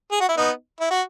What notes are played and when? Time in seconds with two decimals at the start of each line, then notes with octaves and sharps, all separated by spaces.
0.12 G#4
0.20 F#4
0.29 E4
0.37 B3 D#4
0.81 E4
0.91 F#4